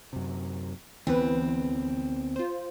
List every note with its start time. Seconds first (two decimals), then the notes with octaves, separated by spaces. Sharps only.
0.13 F#2 C3
1.07 D2 E3 B3 C4 B4
2.36 F4 C5